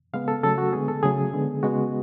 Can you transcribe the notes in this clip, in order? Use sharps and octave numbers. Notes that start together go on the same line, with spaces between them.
C#3 G#3 B3 F5
A4
C#3 F#3 A3 A4
F#4
D3 G#3 B3 G#4
A4
C#3 F#3 A3 G#4
D3 G#3 B3
C#3 G#3 B3 F#4